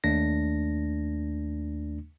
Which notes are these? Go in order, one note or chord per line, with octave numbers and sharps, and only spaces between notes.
D#2 A3 D4 A#6